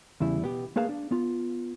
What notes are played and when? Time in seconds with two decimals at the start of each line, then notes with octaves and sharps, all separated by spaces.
0.20 E2 C#3 G3 E4
0.42 B2 B3 G4
0.76 A3 A#3 G#4 B4 F5 A5
0.89 D4
1.11 B3 F4